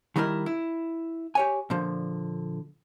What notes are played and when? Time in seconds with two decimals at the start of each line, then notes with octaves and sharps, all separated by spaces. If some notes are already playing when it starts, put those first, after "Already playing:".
0.16 D#3 G3 D#4 E4 A#4
0.46 E4
1.35 G4 C#5 G#5
1.70 A#2 D3 F3